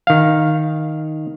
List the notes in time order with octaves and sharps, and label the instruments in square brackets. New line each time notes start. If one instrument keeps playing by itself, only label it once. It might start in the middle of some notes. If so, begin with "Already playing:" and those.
[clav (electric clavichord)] D#3 F5